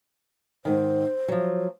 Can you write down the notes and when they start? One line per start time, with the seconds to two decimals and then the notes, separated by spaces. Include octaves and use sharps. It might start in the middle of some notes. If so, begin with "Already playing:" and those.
0.65 G#2 D#3 C5
1.28 F3 F#3